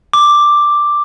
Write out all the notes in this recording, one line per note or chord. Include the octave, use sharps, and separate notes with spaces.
D6